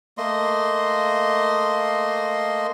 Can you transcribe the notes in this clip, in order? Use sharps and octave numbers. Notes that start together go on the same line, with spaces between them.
A3 A#3 D#5 C6